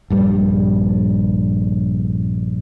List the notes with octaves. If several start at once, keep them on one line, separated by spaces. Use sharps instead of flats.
A#1 G2 G3